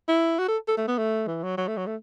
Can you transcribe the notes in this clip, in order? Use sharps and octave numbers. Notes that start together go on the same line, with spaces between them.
E4
F#4
A4
A4
A3
B3
A3
E3
F#3
F#3
A3
F#3
A3